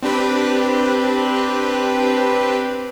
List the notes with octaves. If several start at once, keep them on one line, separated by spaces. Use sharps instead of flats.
C4 D4 G4 B4